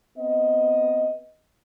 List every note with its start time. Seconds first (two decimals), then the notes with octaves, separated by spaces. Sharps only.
0.17 B3 C4 D#5